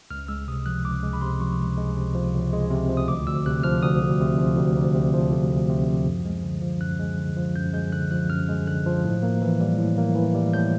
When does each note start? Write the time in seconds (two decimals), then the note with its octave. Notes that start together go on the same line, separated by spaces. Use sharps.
0.11 C#2 F6
0.28 G#3 E6
0.48 C3 D#6
0.66 F3 F#6
0.84 C#2 D6
1.03 G#3
1.13 B5
1.21 C3 C6
1.41 F3 C#6
1.59 C#2
1.77 G#3
1.97 C3
2.15 F3
2.34 C#2
2.53 G#3
2.70 C3
2.89 F3
2.97 D#6
3.08 D2 D6
3.27 D2 E6
3.46 C3 F#6
3.64 F3 F6
3.82 D2 D#6
4.02 D2
4.20 C3
4.38 F3
4.57 D2
4.76 D2
4.95 C3
5.14 F3
5.32 D2
5.51 D2
5.69 C3
5.88 F3
6.07 F#2
6.25 G#3
6.43 D3
6.62 F3
6.80 F#2 F#6
7.00 G#3
7.18 D3
7.37 F3
7.55 F#2 G6
7.74 G#3 G6
7.92 D3 F#6
8.11 F3 F#6
8.29 F#2 F6
8.48 G#3
8.67 D3 F#6
8.86 F3
9.04 A2
9.23 A#3
9.42 E3
9.60 G3
9.78 A2
9.98 A#3
10.16 E3
10.35 G3
10.53 A2 G6